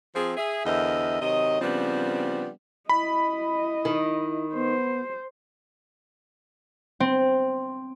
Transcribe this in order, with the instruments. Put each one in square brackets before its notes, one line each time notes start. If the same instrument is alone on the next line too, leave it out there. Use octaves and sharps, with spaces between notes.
[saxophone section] F3 C4 G#4
G#4 E5
E2 D3 A#4 C5 D#5 E5
C3 D#3 F#3 D#5
C#3 F3 G3 B3 C4 D4
[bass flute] E4 [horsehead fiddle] D#5 [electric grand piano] B5
[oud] D#3
[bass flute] B3 [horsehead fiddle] C5
[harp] C4